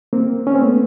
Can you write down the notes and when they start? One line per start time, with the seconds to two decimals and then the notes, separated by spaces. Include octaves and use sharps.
0.13 A#3 C4
0.47 C#4
0.55 C4
0.62 A3 B3